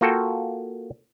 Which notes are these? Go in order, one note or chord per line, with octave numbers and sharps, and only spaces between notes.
A#3 F4 F#4 A4 G5